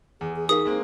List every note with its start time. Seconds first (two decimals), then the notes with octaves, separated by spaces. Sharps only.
0.21 E2 G#4
0.36 G#4
0.49 D#4 G#4 A#4 F5 D#6
0.65 G#3 A#3 C4